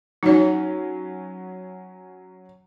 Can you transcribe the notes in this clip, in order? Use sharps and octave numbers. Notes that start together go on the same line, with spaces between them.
F#3 C#4 D#4 C#5